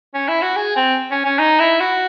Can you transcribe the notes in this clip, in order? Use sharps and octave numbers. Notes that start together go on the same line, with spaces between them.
C#4
E4
F#4
G#4
C4
C#4
C#4
D#4
E4
F#4